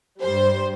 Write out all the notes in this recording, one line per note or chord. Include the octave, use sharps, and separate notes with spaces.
G2 G3 C5